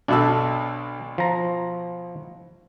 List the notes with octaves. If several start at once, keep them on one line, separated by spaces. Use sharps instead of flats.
B1 B2 D4 A4 E6
F3 A#5